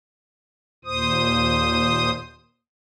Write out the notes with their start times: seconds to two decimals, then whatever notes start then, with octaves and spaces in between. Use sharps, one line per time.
0.85 D#2 A#2 C5 D#6